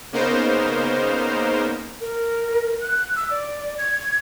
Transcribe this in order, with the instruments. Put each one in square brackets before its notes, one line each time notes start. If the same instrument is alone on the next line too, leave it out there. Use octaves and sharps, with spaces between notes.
[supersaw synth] C#3 A#3 B3 D#4 A#4 C5
[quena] A#4
F#6
E6
D5
G#6